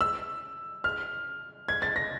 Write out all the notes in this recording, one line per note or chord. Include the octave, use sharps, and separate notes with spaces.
E6
F6
G#6
A6
A#6